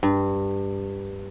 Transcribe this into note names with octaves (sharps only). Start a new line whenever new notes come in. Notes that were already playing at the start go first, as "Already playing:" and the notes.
G2